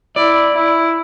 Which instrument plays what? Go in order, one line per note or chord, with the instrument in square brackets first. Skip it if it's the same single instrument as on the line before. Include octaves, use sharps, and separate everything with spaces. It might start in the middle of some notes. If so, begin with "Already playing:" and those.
[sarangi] E4 [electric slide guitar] D5
[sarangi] E4